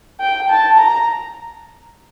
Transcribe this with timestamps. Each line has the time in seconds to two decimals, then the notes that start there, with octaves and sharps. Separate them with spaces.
0.20 G5
0.49 A5
0.78 A#5